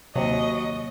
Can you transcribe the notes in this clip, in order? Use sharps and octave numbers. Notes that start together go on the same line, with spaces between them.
D#2 C3 F#3 D#5 C#6